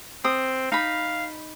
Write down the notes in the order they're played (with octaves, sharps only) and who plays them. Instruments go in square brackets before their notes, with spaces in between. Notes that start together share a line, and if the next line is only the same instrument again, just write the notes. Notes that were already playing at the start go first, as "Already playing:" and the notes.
[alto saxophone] C4 [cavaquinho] D#6
[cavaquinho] D#4 B5 [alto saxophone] F5